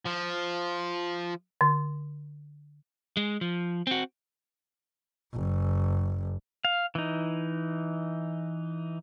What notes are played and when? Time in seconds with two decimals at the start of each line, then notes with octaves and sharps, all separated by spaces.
0.05 F3
1.61 D3
3.17 G#3
3.41 F3
3.87 C4 F#4
5.34 F#1
6.65 F5
6.95 E3 D#4